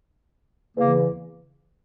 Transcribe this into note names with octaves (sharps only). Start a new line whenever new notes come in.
E2 C#3 E3 A#3